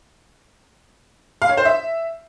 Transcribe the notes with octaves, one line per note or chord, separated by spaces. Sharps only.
F5
C#5
C5
E5